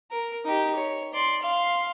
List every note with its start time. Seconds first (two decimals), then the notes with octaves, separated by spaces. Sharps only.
0.11 A#4
0.45 D#4 G4
0.75 C#5
1.14 D5 C6
1.42 F5 C6